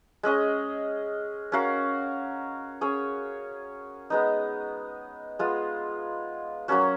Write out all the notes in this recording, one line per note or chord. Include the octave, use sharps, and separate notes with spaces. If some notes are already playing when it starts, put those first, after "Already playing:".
G#3 C#4 G#4 D#5
C#4 F#4 A#4 F5
C#4 G#4 C#5
G#3 B3 D#4
G#3 B3 F4
F#3 A#3 C#4 F#4